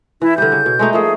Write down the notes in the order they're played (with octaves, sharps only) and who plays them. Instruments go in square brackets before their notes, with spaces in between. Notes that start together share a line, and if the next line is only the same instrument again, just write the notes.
[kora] E3 [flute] E4
[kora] D3 G3 [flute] G6
[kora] C#3
B2
G#3 A3 D#4
[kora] F3 A3 A#3 [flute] G#4